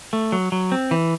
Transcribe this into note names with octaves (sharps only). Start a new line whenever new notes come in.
A3
F#3
F#3
C4
E3